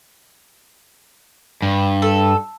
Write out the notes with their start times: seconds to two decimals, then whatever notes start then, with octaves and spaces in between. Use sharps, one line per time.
1.62 G2
2.02 A4